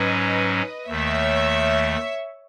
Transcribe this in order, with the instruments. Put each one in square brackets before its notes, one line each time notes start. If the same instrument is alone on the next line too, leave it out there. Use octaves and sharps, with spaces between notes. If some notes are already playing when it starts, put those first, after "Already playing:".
Already playing: [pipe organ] G#2 F#3 C#4 [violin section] B4 D#5
[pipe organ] D#2 D#3 A3 [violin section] C#5 E5